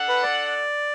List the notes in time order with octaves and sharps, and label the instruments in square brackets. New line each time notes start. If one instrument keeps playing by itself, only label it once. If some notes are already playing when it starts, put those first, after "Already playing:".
Already playing: [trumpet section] D4 A4 F#5
[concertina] B4
D5